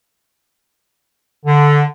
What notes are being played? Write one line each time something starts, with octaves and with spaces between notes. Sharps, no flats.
D3